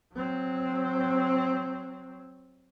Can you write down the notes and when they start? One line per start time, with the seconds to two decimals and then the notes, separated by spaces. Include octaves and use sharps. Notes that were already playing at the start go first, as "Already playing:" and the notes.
0.14 F#3 C4